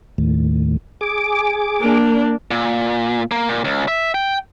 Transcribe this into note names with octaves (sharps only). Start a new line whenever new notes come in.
D#2 A2
G#4 D6
A#3 D4
A#2
A#3
A#2
C#2
E5
G5